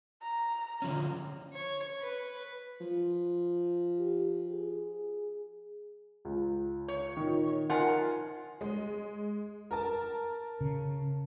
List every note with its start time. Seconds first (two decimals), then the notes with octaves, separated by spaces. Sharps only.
0.22 A#5
0.82 D3 F3 C#4
1.52 C#5
2.02 B4
2.80 F3
3.99 G4
4.52 G#4
6.25 C#2
6.88 C#5
7.17 A#2 D#3
7.70 F3 D#4 F4 A#4 F#5 G#5
8.61 G#3
9.71 A#4 A5
10.61 C#3